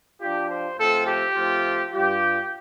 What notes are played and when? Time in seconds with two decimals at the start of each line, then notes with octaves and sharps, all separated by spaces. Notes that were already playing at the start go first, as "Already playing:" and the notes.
0.21 F3 D4 F4 G4
0.50 C5
0.79 A2 F3 C4 F4 A4
1.07 G4
1.35 A2 F3 C4 F4
1.93 G2 G3 F4 G4